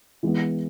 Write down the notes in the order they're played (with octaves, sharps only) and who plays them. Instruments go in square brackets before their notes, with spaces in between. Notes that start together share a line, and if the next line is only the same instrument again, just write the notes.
[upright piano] E3 G#3 B3